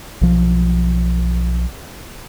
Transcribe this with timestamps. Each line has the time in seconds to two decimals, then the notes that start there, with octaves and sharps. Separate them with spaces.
0.21 B1 F3